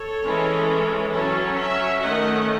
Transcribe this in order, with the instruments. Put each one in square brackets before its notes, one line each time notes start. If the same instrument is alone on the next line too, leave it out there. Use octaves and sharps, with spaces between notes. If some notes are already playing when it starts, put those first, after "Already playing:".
Already playing: [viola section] A4 C#5
E3 G#3 C#4
F#3 C#4 A4 C#5
C#5 E5
D#3 A3 C#4 D#5 F#5